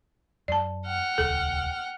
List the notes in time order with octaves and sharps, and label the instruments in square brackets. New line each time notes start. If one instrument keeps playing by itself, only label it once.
[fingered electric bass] F#2 [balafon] D5 A5
[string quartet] F#5 G5 F6
[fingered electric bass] D#1 C#2 [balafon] A4